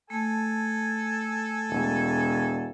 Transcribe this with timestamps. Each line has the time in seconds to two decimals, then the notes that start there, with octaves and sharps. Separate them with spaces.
0.10 A3 A4 G#5
1.70 E1